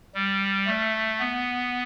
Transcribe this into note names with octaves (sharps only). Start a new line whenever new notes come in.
G3
A3
B3